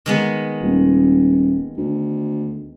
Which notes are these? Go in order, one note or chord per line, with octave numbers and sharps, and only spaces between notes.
D#3 G#3 B3
D#1
D2